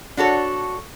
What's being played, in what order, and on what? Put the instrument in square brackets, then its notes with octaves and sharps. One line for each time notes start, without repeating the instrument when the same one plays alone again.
[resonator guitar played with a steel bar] D4 F#4 A4 C#5